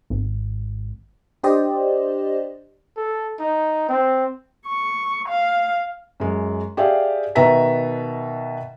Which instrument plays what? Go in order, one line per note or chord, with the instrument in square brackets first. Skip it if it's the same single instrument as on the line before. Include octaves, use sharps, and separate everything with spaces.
[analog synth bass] G#1
[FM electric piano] D4 G4 C5 D5 D#5
[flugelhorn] A4
D#4
C4
[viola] C#6
F5
[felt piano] F#2 G#3
G4 G#4 D5 E5 F5
B2 D#3 B4 E5 A#5 B6